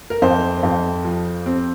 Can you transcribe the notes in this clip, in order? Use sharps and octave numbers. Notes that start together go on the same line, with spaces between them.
A#4
F2 C5
F2
F3
C4